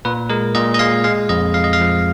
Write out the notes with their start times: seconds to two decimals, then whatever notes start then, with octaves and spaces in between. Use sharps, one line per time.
0.05 A#2 B4
0.30 G#3 A#4
0.55 A#2 D#5
0.74 D#5
0.79 G#3 F5
1.04 G#3 F5
1.29 F2 D#5
1.54 F2 F5
1.64 D#5
1.73 F5
1.80 F3